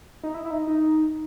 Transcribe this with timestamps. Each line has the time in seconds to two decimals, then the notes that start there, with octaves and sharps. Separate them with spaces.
0.23 D#4
0.34 E4
0.45 E4
0.51 D#4
0.67 D#4